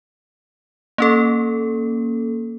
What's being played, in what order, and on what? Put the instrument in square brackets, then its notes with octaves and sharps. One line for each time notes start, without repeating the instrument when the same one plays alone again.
[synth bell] A#3 C#4 A4